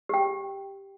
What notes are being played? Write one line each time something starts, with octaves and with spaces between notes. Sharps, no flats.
G4 G5